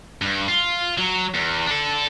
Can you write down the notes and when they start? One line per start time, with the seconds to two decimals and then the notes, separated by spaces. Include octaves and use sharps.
0.22 G2
0.48 F4
0.98 F#3
1.34 E2
1.66 D4 A4